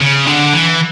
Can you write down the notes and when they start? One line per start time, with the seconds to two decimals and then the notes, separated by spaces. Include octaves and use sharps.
0.02 C#3
0.27 D3
0.53 E3